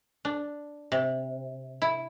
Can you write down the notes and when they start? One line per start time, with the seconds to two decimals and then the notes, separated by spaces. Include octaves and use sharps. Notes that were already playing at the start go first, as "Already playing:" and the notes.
0.25 D4
0.92 C3
1.82 E4